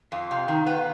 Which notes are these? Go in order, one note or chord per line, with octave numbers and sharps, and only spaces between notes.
F2 F5
C3
D#3
B3